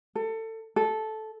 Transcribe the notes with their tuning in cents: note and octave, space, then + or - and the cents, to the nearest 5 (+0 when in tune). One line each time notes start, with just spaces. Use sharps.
A4 +25
A4 -10